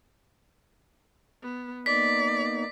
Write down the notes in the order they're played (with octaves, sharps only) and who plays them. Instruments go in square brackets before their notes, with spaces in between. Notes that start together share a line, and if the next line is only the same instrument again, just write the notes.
[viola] B3
[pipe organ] A#3 B3 D#4 [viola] D5 [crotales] B6